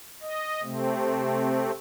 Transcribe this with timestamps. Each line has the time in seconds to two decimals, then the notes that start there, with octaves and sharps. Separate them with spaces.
0.21 D#5
0.62 C3 A3 C4